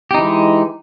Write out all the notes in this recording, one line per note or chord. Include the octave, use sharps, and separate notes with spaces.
E3 G#3 D#4 G4